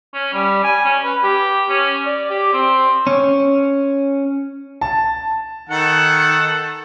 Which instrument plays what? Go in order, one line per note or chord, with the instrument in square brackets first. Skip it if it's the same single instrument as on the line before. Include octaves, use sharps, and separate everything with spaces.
[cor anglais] C#4
G3
G#5
C#4
B4
G4
C#4
D5
G4
C4
[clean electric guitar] C#4
[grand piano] A5
[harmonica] D#3 F#5 [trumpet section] A4